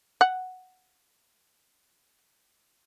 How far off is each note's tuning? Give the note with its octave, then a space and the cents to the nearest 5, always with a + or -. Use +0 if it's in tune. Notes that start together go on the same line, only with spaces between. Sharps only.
F#5 +0